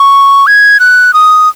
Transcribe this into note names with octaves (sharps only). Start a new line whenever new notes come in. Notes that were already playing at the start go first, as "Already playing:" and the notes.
Already playing: C#6
G#6
F#6
D#6